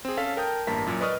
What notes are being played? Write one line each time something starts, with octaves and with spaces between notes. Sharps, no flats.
C4 G#4
C#4 A4 F5 B6
A#4 G5 A5 D#6 G6
A1 G2 A#3 A5 A#5 B6
F#2 A#2
B4 D5 D#5 C#6 D#6 F6